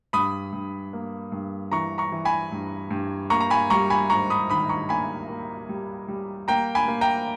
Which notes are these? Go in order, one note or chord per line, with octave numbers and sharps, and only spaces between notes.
G2 B5 D#6
G2
A#3
G2
E3 A#5 C#6
A#5 C#6
E3
G#5 B5
G2
G2
A#3 A#5 C#6
A#5
G#5 B5
G3 A#5 C#6
G#5 B5
G#2 A#5 C#6
B5 D#6
D#3 B5 D#6
A#5 C#6
A#3 G#5 B5
A#3
G3
G3
A#3 G5 A#5
G#5 B5
A#3
G5 A#5